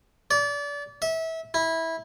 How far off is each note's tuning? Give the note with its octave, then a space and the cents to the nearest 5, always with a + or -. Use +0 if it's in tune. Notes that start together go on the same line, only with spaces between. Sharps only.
D5 -30
E5 -25
E4 -15